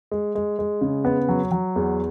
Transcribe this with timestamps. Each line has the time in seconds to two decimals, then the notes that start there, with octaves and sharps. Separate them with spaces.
0.11 G#3
0.35 G#3
0.59 G#3
0.81 C#3
1.05 B3
1.28 F#3
1.51 F#3
1.76 E2